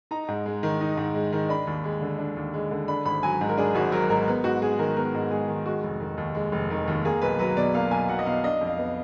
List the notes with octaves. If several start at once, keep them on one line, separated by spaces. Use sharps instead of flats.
D#4 A#5
G#2
G#3
D#3
D#4
G#2
G#3
D#3
D4 B5
D#2
G#3
D3
D4
D#2
G#3
D3
D4 B5
G#1 B5
F#3 G#5
G#2
A#4
D4 G#4
G#1 F#4
F#3 A#4
G#2 A#4
B3
G#2 F#4
G#3 G#4
D#3 A#4
B3 A#4
G#2
G#3 G#4
D#3
G#3 F#4
F1
D#3
D#2
G#3
F1
D#3
D#2
A#3 G#4
B1 B4
F#3 B4
B2 D5
A#3 F5
B1 G#5
F#3 F#5
D#5
B2 F5
D4 D#5
F2
F5
B3